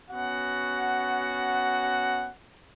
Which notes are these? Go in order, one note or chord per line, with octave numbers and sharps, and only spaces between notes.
B3 C#4 F#4 F#5